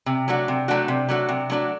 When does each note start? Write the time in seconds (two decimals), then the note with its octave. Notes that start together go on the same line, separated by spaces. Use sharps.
0.06 C3
0.28 F#3 A3 D4 F#4
0.48 C3
0.68 F#3 A3 D4 F#4
0.88 C3
1.09 F#3 A3 D4 F#4
1.29 C3
1.50 F#3 A3 D4 F#4